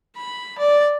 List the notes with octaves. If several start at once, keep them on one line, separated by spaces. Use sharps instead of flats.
B5
D5